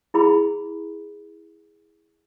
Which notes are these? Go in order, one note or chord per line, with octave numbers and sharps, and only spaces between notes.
E4 G#4 B5